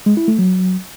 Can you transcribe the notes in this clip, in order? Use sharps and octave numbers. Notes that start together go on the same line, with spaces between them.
G#3
E4
A3
F#3